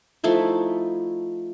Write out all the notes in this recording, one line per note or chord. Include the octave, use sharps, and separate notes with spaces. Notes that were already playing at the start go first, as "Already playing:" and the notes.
F3 A3 D#4 E4